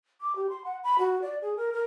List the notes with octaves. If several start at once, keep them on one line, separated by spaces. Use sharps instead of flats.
D6
G4
C6
F#5
B5
F#4
D5
G#4
A#4
A#4